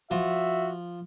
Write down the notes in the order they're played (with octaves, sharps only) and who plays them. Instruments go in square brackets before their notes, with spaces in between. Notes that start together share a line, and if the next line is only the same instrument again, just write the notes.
[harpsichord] F3 [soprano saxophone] F#4 [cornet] E5